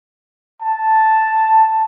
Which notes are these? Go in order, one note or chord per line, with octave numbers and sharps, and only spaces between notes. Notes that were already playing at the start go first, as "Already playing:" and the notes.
A5